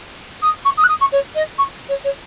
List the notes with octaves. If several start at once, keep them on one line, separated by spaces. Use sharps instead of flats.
D#6
C#6
D#6
F#6
D#6
C#6
C#5
D#5
C#6
C#5
C#5